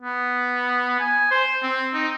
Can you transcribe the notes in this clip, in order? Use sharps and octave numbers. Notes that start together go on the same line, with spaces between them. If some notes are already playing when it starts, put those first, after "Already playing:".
B3
G#5
C5
C4
D#4